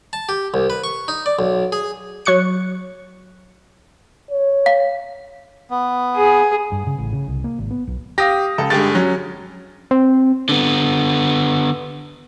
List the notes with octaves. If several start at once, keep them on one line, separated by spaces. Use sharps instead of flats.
A5
G4
C2
B4
C#6
D#4
D5
B1
G#4
F#3 C#6 F#6 C#7
C#5
F5
B3
G#4
G2
C#3
A1
C#3
C2
A#3
G#1
B3
B1
G4 F5 D#6 A#6
C#2 A4
G2 D3 G#3 G4 A6
F#3 C#4
C4
D3 B3